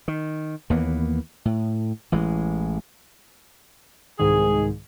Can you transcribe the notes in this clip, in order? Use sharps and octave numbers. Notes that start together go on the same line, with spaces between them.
D#3
D#2 E3 A#3 B3
A2
A1 E3 G#3
C2 G#2 D#3 G#4